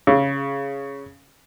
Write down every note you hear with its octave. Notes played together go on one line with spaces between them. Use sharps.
C#3